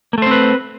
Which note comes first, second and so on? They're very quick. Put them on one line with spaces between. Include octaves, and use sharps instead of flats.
A#3 A3 C5 C4 B4